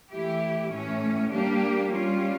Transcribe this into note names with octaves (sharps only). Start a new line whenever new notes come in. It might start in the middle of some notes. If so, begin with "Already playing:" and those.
E3 A3 E4 G4
A2 E3 A3 C#4
G3 A#3 D4 G4
G3 C#4 F4